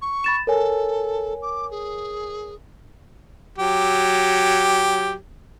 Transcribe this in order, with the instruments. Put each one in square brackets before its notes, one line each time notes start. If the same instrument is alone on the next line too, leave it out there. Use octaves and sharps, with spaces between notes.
[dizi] C#6
[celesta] B5 A6 E7
[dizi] A4 [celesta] A#4 C#5 G#5
[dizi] D6
G#4
[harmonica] F#3 G4